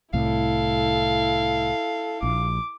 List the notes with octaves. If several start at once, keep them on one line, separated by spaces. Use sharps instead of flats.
C2 A2 E4 A4 F5
A#1 D6